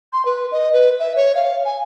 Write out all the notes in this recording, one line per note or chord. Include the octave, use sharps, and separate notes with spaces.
C6
B4
D#5
B4
E5
C#5
F5
G#5